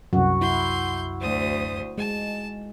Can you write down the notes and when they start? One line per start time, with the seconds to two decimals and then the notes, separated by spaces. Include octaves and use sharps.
0.13 C2 F#2 F#4
0.42 E4 C6 G6
1.21 D2 C5 D#6
1.98 G#3 A5